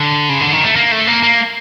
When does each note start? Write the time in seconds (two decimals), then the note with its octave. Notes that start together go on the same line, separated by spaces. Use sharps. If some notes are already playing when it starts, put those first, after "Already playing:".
Already playing: D3
0.29 C#3
0.41 D3
0.53 D#3
0.64 A3
0.76 A#3
0.92 A3
1.07 A#3
1.23 A#3